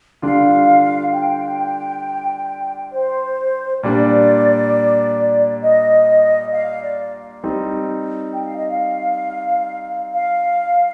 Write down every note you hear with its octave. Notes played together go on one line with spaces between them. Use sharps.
D3 G3 D4 F4 F5
G5
C5
A#2 G3 D4 D5
D#5
F5
D5
G3 C4 D#4
G5
F5
D#5
F5
F5